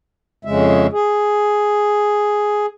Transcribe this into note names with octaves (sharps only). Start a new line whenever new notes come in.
F2 C#3 G#3 E5
G#4